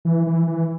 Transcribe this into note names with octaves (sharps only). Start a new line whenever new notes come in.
E3
E3
E3